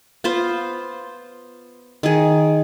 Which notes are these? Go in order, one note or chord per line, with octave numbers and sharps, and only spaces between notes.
B3 F4 C5
D#3 G#4